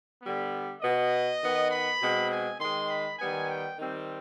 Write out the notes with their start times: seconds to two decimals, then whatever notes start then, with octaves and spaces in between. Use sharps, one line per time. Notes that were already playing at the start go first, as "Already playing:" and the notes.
0.23 D3 G3 B3
0.82 B2 B3 D#5
1.41 D#3 B3
1.71 B5
2.01 B2 G#3 C4
2.30 G#5
2.60 D#3 G#3 C4 C6
2.90 B5
3.19 D#3 G3 B3 G#5
3.49 G5
3.79 D#3 G3 C4